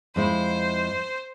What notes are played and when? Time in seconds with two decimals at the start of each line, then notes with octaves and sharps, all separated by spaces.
0.16 F2 G#3 E4 C5